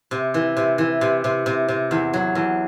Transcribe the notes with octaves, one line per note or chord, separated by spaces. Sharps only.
C3
E3
C3
E3
C3
C3
C3
C3
E2
F#3
E2